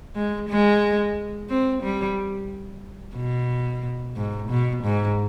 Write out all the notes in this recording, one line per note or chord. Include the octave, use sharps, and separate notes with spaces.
G#3
G#3
C4
G3
B2
G#2
B2
G#2